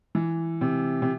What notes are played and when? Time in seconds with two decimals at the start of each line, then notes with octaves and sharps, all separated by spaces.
0.15 E3
0.61 C3
1.02 C3